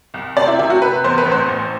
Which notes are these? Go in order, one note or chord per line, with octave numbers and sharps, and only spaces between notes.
C2
C3 D5
E4
C3 E4
F#4
C3 B4
E2 C5
B4
A1
C5
A1